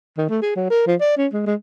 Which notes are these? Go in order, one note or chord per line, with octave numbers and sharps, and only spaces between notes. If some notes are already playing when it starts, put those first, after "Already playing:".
D#3
A3
G#4
F#3
A#4
F3
D5
C#4
G#3
G#3